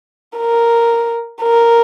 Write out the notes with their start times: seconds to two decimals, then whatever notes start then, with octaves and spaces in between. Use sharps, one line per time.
0.38 A#4
1.42 A#4